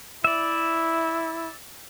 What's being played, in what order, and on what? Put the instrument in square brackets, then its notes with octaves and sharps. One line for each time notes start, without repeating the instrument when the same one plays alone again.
[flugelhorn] E4 [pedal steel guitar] D5 E5